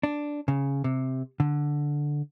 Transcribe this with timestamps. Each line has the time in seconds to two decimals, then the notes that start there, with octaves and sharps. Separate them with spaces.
0.03 D4
0.48 C#3
0.84 C3
1.40 D3